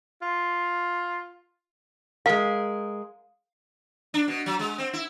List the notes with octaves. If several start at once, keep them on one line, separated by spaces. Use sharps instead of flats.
F4
G#3 A#4 F5
D4
B2
F#3
G#3
C4
E4